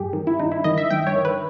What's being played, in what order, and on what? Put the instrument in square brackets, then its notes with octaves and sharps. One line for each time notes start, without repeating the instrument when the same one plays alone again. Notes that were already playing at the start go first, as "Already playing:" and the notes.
Already playing: [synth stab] G2 G4 G#4
D#3
E4
G2 D#4
E4
D#3 D#5
E5
G2 G5
C#5
D#3
B4